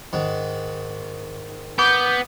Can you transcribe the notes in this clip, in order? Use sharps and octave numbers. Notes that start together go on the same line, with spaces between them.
G#2 D#3 F#5
B3 D6 G6